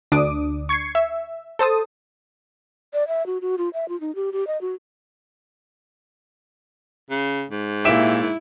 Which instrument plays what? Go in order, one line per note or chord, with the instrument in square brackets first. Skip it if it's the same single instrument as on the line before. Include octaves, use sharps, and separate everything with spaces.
[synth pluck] D2 D4 D6 D#6 D7
C#6 G#6 C7 C#7
E5
A4 C5 A5 D#6
[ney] D5
E5
F#4
F#4
F4
E5
F4
D#4
G4
G4
D#5
F#4
[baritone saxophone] C#3
G#2
[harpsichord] A#2 G4 [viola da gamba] E4 [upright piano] E5 D7 E7